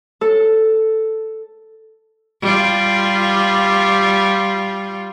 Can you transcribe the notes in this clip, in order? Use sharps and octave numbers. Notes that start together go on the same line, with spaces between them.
A4
G3 F4